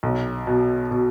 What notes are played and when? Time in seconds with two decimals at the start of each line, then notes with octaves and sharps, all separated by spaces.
0.03 B1
0.47 B2
0.91 B2